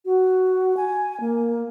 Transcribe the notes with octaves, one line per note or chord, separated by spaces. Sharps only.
F#4
G#5
A#3